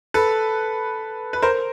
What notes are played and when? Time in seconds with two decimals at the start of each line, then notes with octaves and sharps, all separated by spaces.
0.14 A4 B4
1.33 B4
1.42 A#4 C5